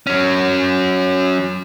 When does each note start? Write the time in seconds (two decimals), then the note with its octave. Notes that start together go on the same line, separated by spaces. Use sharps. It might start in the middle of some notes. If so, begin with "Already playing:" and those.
0.07 F#3 C#4